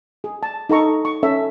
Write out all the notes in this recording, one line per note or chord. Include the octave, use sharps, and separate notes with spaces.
G#4
A5
D#4 A4 A#5 C#6
C#6
C#4 A4 E5